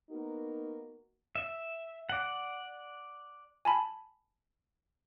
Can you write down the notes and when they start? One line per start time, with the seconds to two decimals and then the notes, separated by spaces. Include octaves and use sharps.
0.10 A#3 B3 D#4 F#4 A#4
1.35 E5
2.09 D5 F#5
3.65 G#5 A5 B5